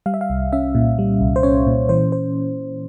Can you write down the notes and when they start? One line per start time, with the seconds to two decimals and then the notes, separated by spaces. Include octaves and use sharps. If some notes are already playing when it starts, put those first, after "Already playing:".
0.06 G3 F5
0.14 E5
0.21 F5
0.30 C2
0.52 C#4 E5
0.75 A#2
0.98 G3
1.21 C2
1.36 C5
1.43 C#4 C#5
1.67 A#2
1.89 E3 C5
2.12 C5